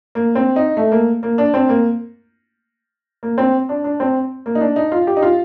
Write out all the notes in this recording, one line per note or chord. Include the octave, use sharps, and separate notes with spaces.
A#3
C4
D#4
A3
A#3
A#3
D4
C4
A#3
A#3
C4
D4
D4
C4
A#3
D#4
D4
D#4
F4
G4
D#4
F4